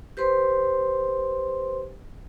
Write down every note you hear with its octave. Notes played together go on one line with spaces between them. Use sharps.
G4 B4 C5 C6